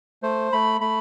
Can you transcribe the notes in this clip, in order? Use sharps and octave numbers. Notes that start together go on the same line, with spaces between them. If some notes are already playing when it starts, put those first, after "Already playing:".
A3 C5
A3 B5
A3 B5